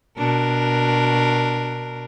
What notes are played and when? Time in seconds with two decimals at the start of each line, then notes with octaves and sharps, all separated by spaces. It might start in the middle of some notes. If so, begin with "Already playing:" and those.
0.18 B2 D4 A#4